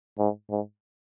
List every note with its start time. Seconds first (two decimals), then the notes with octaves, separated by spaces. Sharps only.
0.19 G#2
0.50 G#2